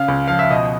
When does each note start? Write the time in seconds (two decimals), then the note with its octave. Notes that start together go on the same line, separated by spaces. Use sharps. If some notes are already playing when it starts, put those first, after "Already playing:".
Already playing: C#3 F5
0.08 C#2
0.28 F3 F5
0.39 E5
0.50 B2 D#5